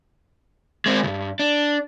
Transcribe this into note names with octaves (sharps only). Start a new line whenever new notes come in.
G#3 C4
C#2 G2
D4